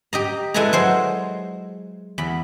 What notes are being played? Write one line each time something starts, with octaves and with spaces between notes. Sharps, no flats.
G4 D#5 A#5
G#3 E4 A4 B4 G#5 A#5
F#3 G#3 C5
E2 B5